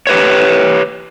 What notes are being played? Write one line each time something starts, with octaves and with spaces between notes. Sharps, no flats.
G4 B4 C#5